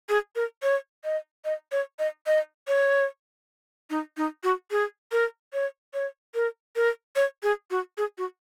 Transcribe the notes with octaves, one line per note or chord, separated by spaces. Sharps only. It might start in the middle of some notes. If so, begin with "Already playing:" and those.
G#4
A#4
C#5
D#5
D#5
C#5
D#5
D#5
C#5
D#4
D#4
F#4
G#4
A#4
C#5
C#5
A#4
A#4
C#5
G#4
F#4
G#4
F#4